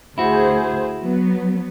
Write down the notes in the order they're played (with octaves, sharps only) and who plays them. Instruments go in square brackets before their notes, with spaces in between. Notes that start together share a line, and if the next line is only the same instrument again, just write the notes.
[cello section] D2 G#4 C5 [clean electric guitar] E4 F#4
[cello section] F#3 B3